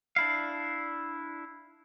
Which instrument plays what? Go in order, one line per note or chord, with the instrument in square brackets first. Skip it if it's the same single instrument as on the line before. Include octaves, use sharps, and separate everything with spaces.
[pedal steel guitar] D4 E4 F5